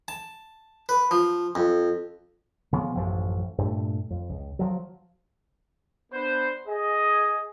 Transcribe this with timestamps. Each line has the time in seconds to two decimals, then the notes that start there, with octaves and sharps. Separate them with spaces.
0.08 A5
0.89 B4
1.11 F3
1.55 F2
2.73 C#3 F3 B3
2.95 A1 F#2 F3
3.58 G2 A#2 A3
4.10 F2
4.30 C#2
4.59 F3 F#3
6.13 B3 D4 B4 C5
6.68 G#4 D#5